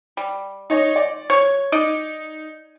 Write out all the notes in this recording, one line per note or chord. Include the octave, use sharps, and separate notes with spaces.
G3
D#4 C#5 D#5
D5
C#5 G#6
D#4 D5 D#5